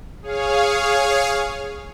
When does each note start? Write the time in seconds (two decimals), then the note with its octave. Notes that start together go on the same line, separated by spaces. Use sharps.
0.22 G#4 C#5 F5